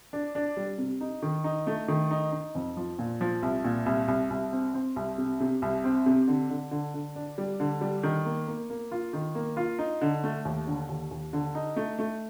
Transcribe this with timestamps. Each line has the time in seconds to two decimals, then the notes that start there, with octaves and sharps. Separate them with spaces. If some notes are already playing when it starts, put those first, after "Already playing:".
0.13 D4
0.35 D4
0.57 G3
0.78 C3
1.01 D#4
1.22 D#3
1.44 D#4
1.67 A3
1.88 D#3
2.11 D#4
2.32 D#4
2.55 F2
2.77 F3
2.99 A#2
3.21 F3
3.42 C2
3.64 A#2
3.86 C2
4.08 C2
4.30 C2
4.52 C4
4.74 C4
4.96 C2
5.18 C3
5.40 C3
5.62 C2
5.84 C4
6.06 C3
6.27 D3
6.50 D3
6.71 D3
6.94 D3
7.16 D4
7.38 G3
7.60 D3
7.81 G3
8.03 D#3
8.26 A#3
8.48 A#3
8.70 A#3
8.92 F4
9.13 D#3
9.35 A#3
9.57 F4
9.79 D#4
10.01 D3
10.24 A3
10.45 D#2
10.67 D3
10.89 D#2
11.11 D#2
11.33 D3
11.55 D#4
11.76 A3
11.99 A3